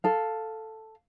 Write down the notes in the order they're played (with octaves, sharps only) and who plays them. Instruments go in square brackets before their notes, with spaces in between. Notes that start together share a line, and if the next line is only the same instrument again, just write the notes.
[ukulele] A4 F5